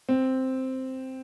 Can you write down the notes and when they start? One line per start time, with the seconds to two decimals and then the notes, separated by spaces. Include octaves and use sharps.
0.09 C4